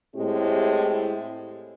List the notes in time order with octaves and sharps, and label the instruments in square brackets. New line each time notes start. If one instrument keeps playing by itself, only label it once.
[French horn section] A2 G#3 C4 E4 G4